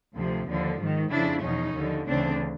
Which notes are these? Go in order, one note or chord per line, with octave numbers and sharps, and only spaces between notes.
D2 C3 F3
D#2 D3 F3
G#2 D#3
F2 C#3 F3 D4 E4
E2 B2 C#4 D#4
D#2 D3 F3
D2 C#3 E3 C4 D4